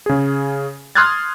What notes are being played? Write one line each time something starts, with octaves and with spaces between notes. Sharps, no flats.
C#3 G#4
C6 D#6 F6 F#6 G#6 A6